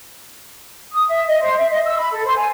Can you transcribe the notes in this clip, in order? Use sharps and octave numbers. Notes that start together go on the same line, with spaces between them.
D#6
E5
D#5
C5
E5
D#5
E6
B5
A4
C5
G#5